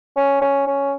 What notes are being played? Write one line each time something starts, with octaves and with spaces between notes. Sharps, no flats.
C#4
C#4
C#4